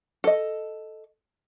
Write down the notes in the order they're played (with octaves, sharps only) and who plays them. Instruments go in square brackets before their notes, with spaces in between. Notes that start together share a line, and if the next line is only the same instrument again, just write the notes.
[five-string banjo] A4 D#5